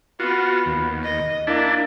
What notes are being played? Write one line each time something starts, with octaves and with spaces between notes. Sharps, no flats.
B3 F4 F#4
D#2
D#5
A#3 D4 E4 A5